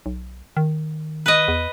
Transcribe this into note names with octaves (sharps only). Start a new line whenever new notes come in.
B1
D#3
B4 D#5
E2